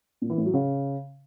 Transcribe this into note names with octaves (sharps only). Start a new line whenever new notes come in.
A#2
E3
A2
F#3
C#3